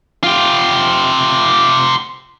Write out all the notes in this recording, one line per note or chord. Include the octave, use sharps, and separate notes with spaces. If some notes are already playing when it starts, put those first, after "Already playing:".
F4 G4